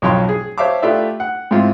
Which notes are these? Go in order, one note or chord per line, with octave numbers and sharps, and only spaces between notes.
B1 F2 C#5 G5 A5 C6
G#4
C5 C#5 E5 F5 A5 D6
A3 F4 G4 B4 D5 E5
F#5
G#2 C4 E4 F4